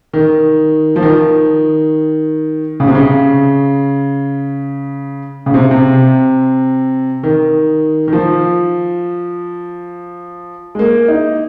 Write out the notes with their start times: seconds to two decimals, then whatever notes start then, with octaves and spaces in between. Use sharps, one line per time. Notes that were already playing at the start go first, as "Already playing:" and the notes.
0.13 D#3
0.96 F3
1.02 D#3
2.80 C#3
2.87 C3
2.95 C#3
5.46 C#3
5.54 C3
5.71 C3
7.23 D#3
8.08 D#3
8.13 F3
10.75 G#3
10.79 A#3
11.08 D#4